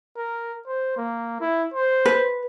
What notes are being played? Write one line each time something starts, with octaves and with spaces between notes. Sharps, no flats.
A#4
C5
A#3
E4
C5
B4